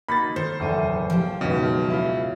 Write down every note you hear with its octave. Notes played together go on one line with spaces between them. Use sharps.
A#3 D#4 F#4 B5 A6
D#3 A4 C5
F#1 E2 A2 A4 D#7
F3 G4
C#2 F#2 B2 D#3 E5
E4 F4